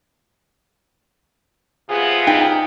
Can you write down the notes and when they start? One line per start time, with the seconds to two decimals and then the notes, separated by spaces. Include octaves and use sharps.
1.90 C3 B3 F4 G#4
2.27 D#4 G5